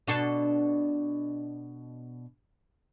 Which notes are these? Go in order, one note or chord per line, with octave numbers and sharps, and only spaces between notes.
B2 D4 A4